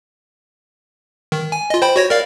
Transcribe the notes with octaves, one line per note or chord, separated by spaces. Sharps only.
D#3
G#5
F4 D#5
C5 G5 B5
F#4 C#5 A#6
A#4 D5 F5